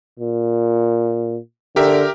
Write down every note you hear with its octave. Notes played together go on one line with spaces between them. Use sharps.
A#2
D3 G4 A#4 E5